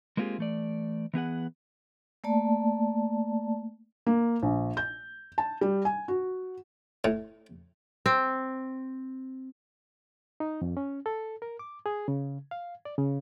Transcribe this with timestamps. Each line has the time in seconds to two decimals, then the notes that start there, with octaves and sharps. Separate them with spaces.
0.17 G#3 A#3 C4 F4 G4 G#4
0.38 E3 A3 D5
1.14 E3 B3 G#4 F#5
2.24 A3 A#3 D5 A5
4.07 A#3
4.42 A#1
4.77 G6
5.38 A5
5.61 G3
5.85 G#5
6.08 F#4
7.04 A2
8.06 C4
10.40 D#4
10.62 F2
10.77 C#4
11.06 A4
11.42 A#4
11.59 D6
11.86 G#4
12.08 C#3
12.51 F5
12.85 D5
12.98 C#3